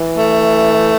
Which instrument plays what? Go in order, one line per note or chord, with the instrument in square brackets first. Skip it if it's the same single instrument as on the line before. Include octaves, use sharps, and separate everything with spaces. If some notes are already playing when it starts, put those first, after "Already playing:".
Already playing: [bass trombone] E3
[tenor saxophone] A3